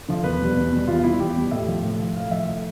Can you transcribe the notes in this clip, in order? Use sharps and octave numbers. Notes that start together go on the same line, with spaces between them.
D3 F3
E2 B4
B2 G3
E2
B2 G3
E2 F4
B2 G3 E4
E2 G4
B2 G3
A2 E5
F3
A2
F3
A2 F5
F3 E5
A2